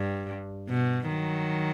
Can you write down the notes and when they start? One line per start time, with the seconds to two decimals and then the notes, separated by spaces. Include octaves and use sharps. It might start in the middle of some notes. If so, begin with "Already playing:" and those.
Already playing: G2
0.69 B2
1.08 D#3 F#3